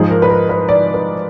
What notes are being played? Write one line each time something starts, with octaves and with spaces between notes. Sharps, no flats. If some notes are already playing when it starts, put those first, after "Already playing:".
Already playing: G#2 F3 G#4
A#4
B4
A#4
B4
D5
B4